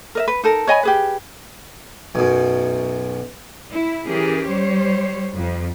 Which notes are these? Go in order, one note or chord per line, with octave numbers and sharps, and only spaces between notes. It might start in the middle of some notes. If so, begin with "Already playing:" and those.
A#4 D#5 E5
B4
D#4 A4 A#4
C#5 D#5 G#5 B5
G4 G#4 B4
B1 F#2
E4
E3 C#4 G4 G#4 A#4
G3 C5 C#5
F2